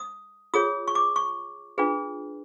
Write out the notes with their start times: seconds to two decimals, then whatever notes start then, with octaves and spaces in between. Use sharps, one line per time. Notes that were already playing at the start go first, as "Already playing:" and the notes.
Already playing: D#6
0.54 F4 G#4 C#5 D#6
0.88 C#6
0.95 D6
1.16 C#6
1.78 D4 F4 G#4 B4